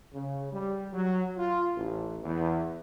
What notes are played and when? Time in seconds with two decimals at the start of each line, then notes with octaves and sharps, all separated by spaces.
0.12 C#3
0.51 G3
0.92 F#3
1.37 F4
1.74 A1
2.23 E2